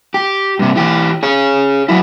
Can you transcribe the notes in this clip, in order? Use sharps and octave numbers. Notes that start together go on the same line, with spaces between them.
G4
G2 C3
E3 G4
G#4 C#5
F#3 E4